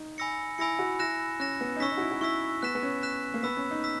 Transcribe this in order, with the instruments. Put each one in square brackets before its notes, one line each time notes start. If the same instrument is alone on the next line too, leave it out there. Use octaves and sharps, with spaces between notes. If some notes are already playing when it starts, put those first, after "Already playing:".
Already playing: [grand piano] D#4
[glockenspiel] G#5 B5 E6 A#6 C#7
[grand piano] E4 [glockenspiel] G#5 B5 E6 A#6 C#7
[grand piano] F#4
[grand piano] E4 [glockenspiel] F#6 A#6 E7
[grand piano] C#4 [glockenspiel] F#6 A#6 E7
[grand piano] B3
D#4
[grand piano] C#4 [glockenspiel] C#6 E6 B6
[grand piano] D#4
F#4
E4
F#4
[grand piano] E4 [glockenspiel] C#6 E6 B6
[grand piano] B3 [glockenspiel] F#6 B6 E7
[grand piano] B3
C#4
[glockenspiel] F#6 B6 E7
[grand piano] A#3
[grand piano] B3 [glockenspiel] B5 E6 B6
[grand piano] C#4
D#4
[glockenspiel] E6 B6